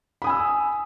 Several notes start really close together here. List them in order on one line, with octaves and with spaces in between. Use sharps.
B5 D#6 G#5 E6